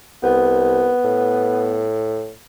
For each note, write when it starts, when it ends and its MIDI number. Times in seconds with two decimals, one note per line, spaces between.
0.23 0.94 36
0.23 1.87 59
1.04 2.31 45